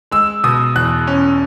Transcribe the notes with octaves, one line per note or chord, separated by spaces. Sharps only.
G#3 E6
B2 D#6
E2 F#6
C#4